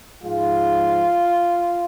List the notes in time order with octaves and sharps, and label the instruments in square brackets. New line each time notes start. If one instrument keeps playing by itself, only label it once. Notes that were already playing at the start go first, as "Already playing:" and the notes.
[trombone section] G#2 F3 G#3 F4